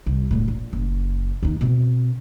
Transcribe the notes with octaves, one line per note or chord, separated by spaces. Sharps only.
C2
E1 A2
A#1
F#1
D#2 D#4
B2 C4